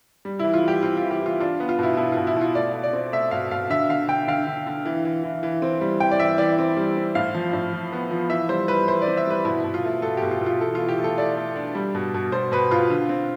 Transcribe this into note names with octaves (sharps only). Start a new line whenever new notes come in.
G3
E3 E4
F4
G3 G4
C4 F4
F4
E3
G4
E3 F4
D4 F4
B3
F4
B2 E4
B2 E4
B2 F4
E4
B2 F4
A3 D5
A3
D5
C4
A3 E5
B2 F5
B2 F5
D3 E5
D3 F5
D3 G5
D3 F5
D3
D3
E3
E3
E3
E3
C4
G3
E3 G5
D5
E3 E5
E3 D5
C4
G3
C4
A2 F5
F3
A2
F3
B3
F3
E3 E5
G3 C5
G3 B4
E3 C5
D5
C4
E5
G3 B4
B2 E4
B2
F4
A3
B2 A4
B2 G4
F4
B2
F4
E3 A4
E3 F4
G4
A3
A4
A3 D5
A3
D4
G3
B2
B2
B2 C5
B2 B4
B2 F4
D3
C4